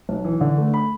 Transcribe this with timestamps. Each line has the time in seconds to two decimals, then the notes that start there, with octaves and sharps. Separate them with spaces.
0.09 B1
0.24 E3
0.41 D3
0.58 A3
0.74 B5